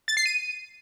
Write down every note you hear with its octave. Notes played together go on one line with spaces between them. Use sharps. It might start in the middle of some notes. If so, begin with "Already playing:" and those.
A6
C7
D#7